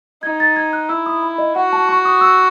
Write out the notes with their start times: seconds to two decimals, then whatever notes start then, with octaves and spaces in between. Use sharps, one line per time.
0.23 D#4 G#6
0.40 A6
0.56 G#6
0.73 F#6
0.89 E4 E6
1.06 D#6
1.23 B5
1.38 D#5
1.56 F#4 F#5
1.73 A5
1.89 C#6
2.05 D#6
2.21 E6